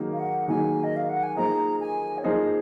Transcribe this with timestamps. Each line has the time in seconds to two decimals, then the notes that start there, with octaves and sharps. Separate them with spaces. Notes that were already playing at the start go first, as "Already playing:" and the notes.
Already playing: D#3 F#3 A#3 D#4 G#4
0.13 F5
0.19 F#5
0.48 D#3 F#3 A#3 D#4 G#4 G#5
0.84 D#5
0.96 F5
1.09 F#5
1.23 G#5
1.36 F3 A#3 D#4 G#4 C5 A#5
1.80 G#5
2.18 C#5
2.24 F3 A#3 D#4 G#4 C5 D#5